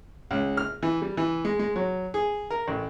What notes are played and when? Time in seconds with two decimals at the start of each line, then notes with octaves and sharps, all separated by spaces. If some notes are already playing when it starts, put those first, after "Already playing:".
0.31 C#2
0.57 F6
0.83 E3
1.02 G3
1.17 E3
1.45 G#3
1.59 G#3
1.76 F#3
2.14 G#4
2.50 A#4
2.68 A1